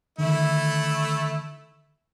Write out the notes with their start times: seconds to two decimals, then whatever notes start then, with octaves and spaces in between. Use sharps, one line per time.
0.18 D3 D#3 A3 E4